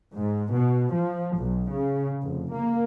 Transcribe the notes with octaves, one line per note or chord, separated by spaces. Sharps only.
G#2
B2
F3
B1
C#3
F1
A#3